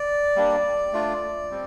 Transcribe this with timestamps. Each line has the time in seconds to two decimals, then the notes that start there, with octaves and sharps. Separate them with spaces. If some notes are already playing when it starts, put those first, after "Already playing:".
Already playing: D5
0.36 G3 A#3 D4
0.93 A3 D4 F4
1.51 G3 C4